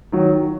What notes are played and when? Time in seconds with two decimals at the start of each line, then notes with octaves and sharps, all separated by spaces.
0.12 D#3 F#3